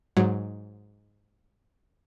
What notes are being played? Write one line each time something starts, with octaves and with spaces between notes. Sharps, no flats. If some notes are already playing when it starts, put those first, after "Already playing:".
G#2 F#3